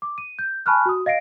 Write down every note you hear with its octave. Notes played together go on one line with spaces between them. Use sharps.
D6
D#7
G6
G#5 A5 B5 C#6 F6 F#6
F#4 D#6
D#5 F5 A#6 C7 D7